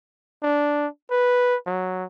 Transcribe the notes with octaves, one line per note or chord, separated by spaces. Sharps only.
D4
B4
F#3